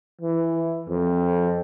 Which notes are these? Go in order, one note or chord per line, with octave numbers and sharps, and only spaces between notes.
E3
F2